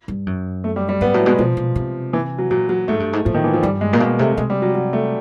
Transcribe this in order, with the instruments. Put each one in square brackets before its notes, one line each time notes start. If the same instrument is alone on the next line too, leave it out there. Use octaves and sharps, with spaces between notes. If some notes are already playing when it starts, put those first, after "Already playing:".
[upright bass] G2
F#2
[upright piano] A3
G3
G3
[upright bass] G#2 [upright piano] B3
[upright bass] A2 [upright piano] F#3
[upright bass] B2 [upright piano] G#3
[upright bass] B2 [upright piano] F3
[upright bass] B2
C3
[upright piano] E3
F#3
[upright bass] A#2 [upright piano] F#3
[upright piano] F#3
[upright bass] G#2 [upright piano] A3
[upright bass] G2
G#2
[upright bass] A2 [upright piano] F3
[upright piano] D#3
E3
F3
[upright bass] G2 [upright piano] G3
[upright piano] G#3
[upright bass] A#2
[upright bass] B2 [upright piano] A#3
[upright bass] C3 [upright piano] A3
[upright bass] C3 [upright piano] G#3
[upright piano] G3
F#3
F#3
A3